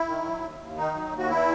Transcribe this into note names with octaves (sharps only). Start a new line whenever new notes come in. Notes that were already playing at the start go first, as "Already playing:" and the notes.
Already playing: E4
D#3
F#3
D#2
D#2
D#3 D#4
F#3
D#2
F#4
E2 E4